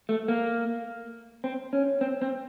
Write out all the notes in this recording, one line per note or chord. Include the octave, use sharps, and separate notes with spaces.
A3
A#3
C4
C#4
C4
C4